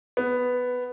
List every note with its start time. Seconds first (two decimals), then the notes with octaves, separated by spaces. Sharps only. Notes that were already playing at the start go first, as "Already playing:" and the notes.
0.17 B3